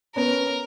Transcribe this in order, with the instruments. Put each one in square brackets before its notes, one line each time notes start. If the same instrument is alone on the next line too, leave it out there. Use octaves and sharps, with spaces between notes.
[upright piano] B3 C#4 [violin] A#4